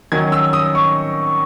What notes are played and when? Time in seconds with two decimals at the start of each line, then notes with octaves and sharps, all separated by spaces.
0.12 D#3 F#3 C#4 G#6
0.32 E6
0.53 D#6
0.75 C#6